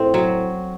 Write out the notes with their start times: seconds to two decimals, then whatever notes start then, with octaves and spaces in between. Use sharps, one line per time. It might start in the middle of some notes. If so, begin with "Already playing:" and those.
Already playing: A2 C4
0.14 F#3